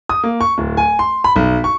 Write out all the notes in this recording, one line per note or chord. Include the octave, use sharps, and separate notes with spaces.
D#6
A#3
C#6
D1
G#5
C6
B5
B1
C#6